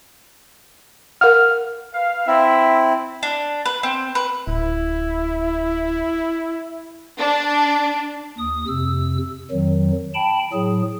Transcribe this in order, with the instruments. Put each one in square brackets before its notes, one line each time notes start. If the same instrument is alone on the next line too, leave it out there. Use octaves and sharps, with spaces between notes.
[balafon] A#4 F5 F#5 [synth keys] F6
[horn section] B4 F5
[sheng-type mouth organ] C4 E4 [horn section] E5
[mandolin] D4
B4
C4
B4
[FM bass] D1 [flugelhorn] E4
[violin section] D4
[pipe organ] D#2 D#6
F2 C3 E6
F2 D#3 F#3
G5 A5 B5
A2 F#3 G#4